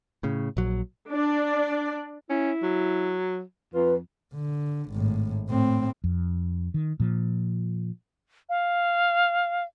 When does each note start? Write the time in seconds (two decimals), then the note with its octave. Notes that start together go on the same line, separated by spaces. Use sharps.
0.23 A2 C#3
0.57 A#1 F#3
1.10 D4 D5
2.30 C#4 E4
2.63 F#3
3.74 F2 F4 B4
4.34 D3
4.90 G#1 A2
5.49 A2 C4
6.04 F2
6.74 D#3
7.00 A#2 F3
8.49 F5